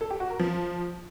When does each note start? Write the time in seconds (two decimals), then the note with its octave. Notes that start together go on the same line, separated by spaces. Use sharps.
0.01 A4
0.10 G4
0.20 F#4
0.30 A#4
0.39 F3